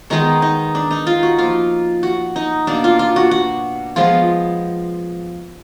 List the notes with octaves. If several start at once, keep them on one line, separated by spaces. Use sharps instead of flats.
D#3 G#3 B3 D#4
D#4
D4
D#4
F4
F#4
F3 A#3 F4
F#4
D#4
B2 A#3 D4
F4
F4
F#4
F#4
F3 G#3 B3 F4